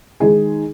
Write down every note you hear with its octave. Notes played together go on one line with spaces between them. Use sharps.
D#3 G#3 D#4 G#4